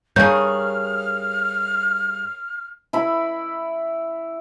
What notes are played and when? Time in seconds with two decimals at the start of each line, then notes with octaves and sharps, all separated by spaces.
0.16 G2 G#4 A#4 C#5 F6 G6
2.93 E4 B5